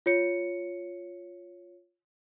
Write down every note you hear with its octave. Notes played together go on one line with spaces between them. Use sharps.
F4 C#5 C#7